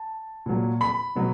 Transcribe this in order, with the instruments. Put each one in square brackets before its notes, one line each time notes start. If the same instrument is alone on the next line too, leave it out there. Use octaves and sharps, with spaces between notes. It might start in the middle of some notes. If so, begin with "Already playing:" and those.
Already playing: [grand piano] A5
A#2 F#3
B5
B2 F#3